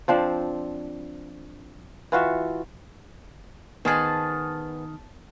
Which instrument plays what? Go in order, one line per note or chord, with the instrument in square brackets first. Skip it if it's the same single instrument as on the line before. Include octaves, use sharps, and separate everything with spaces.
[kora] F3 C4 D4
E3 F4 F#4 E5
[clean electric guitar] D#3 [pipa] G#3 C4 G#4 [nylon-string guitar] B3 [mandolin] A5